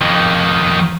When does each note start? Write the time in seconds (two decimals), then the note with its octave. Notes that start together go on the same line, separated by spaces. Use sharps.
0.01 F2 D#3